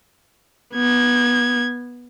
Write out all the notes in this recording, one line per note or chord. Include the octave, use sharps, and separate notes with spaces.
B3 G#6